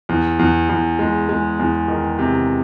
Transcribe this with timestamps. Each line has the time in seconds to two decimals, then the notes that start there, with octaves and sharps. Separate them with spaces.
0.09 E2
0.39 E2
0.69 E2
0.99 G#3
1.29 G#3
1.59 E2
1.88 D#3
2.19 C3